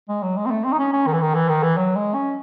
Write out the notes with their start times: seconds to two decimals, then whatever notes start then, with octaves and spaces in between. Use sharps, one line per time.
0.09 G#3
0.22 F#3
0.37 G#3
0.46 C4
0.50 A3
0.64 C4
0.72 D#4
0.79 C#4
0.93 C#4
1.07 D#3
1.13 E3
1.21 D#3
1.34 E3
1.49 D#3
1.63 E3
1.77 F#3
1.96 G#3
2.14 C#4